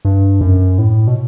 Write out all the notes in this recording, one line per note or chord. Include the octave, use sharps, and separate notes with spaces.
G2
F#2
A2
B2